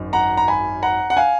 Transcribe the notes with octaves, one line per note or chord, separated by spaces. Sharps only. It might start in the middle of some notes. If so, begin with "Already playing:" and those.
Already playing: G#1 F#2 D#3
F#5 A#5
A#5
G#5 B5
F#5 A#5
F#5
F5 G#5